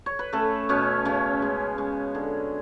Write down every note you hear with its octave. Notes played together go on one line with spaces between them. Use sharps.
C#5
B4
A3 C#4 A4
B2 C#4 C#5
C#3 C#4 C#5
G#3
G#3
D3